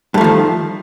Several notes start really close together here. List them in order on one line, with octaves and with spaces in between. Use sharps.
G2 A3 F3 D#3